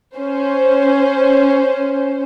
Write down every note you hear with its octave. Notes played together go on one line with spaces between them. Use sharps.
C#4 C5